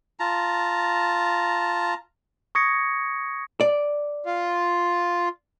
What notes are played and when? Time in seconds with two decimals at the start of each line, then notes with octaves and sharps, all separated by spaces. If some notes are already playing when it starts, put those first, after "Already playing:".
0.20 F4 A5 A#5
2.55 C#6 D#6 G#6 A#6 C#7
3.61 D5
4.26 F4